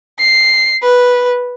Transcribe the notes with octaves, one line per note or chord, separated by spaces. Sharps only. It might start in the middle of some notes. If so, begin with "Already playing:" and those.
C7
B4